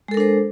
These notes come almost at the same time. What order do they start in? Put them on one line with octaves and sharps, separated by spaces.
G#3 A4 A#4 D4 C5